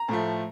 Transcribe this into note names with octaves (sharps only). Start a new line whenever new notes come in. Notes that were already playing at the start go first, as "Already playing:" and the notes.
Already playing: A#5
A2 F3 A3